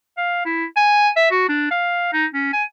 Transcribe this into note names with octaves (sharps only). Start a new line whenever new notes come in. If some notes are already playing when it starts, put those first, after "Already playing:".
F5
E4
G#5
E5
F#4
D4
F5
D#4
C#4
G#5